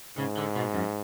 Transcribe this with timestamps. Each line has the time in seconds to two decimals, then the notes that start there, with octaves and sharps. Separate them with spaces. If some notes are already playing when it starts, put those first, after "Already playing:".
0.18 G#2 C#3
0.37 D3
0.56 B2
0.74 F#2